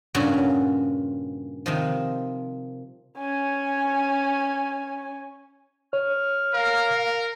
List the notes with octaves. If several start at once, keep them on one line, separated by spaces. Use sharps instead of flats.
G2 A#2 C#3 C#4 F#4
C3 D#3 F3
C#4 G#5
C#5 F6
A#4 F5